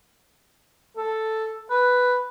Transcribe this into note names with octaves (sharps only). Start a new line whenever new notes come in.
A4
B4